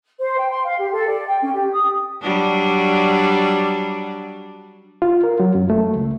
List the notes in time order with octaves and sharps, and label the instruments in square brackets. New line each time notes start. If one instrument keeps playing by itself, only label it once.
[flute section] C5
G5
C6
F5
G4
A4
D5
G5
C#4
G4
D#6
[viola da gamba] F#3 G3 D4
[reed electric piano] F4
A#4
F#3
F#2
A3
C#2